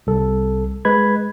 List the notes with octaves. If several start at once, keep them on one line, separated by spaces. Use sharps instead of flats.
C2 A4
G#3 B4 B5 G#6